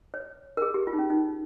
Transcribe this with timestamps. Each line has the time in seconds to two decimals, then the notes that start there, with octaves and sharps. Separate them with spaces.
0.14 C#5
0.57 A#4
0.62 G#4
0.74 G4
0.87 F4
0.93 D#4
0.99 C#4
1.10 D#4